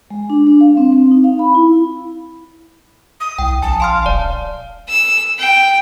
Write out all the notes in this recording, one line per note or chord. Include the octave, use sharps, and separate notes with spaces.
G#3
D4
D4
F5
C4
C4
D#4
F5
B5
E4
D#6
C2 G5
A#1 G#5 A5
F5 A5 C6 F6
D#1 D5
E6
G5